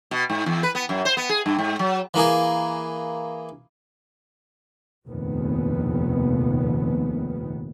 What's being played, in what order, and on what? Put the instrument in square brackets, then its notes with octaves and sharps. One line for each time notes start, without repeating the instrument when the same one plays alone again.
[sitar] B2
G#2
E2
B4
B3
F#2
C5
B3
G#4
G2
G#2
F#3
[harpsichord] E3 A#3 G#4
[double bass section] F1 A#1 D#2 A#2 D#3 B3